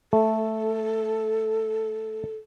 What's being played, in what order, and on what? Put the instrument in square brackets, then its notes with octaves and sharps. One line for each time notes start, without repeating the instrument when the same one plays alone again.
[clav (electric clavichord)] A3 [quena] A4